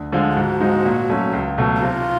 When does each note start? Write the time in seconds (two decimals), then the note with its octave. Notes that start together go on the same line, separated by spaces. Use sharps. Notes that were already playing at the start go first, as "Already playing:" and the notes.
Already playing: D2
0.12 D3 F3 G#3
0.36 G#2 F#4
0.60 F3 G#3 C4 D#4
0.85 A#2
1.10 F#3 A3 C#4
1.33 C#2
1.58 B2 F#3 A3
1.81 C3 F4